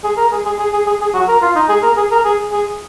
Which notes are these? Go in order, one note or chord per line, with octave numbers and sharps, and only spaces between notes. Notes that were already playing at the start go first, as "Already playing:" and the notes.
G#4
A#4
G#4
G#4
G#4
G#4
G#4
G#4
F#4
A#4
F4
D#4
G#4
A#4
G#4
A#4
G#4
G#4